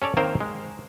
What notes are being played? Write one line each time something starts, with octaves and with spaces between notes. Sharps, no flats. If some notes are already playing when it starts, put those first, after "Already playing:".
C#4 A4 C#5 D5
D#3 A#3 C4 A#4 C5
G#3